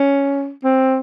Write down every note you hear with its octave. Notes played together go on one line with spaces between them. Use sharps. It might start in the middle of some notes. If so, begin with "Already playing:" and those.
Already playing: C#4
C4